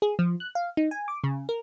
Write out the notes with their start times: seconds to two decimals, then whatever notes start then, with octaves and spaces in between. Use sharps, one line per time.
0.02 G#4
0.19 F3
0.40 F#6
0.55 F5
0.77 D#4
0.91 G#5
1.08 D6
1.24 C#3
1.49 A#4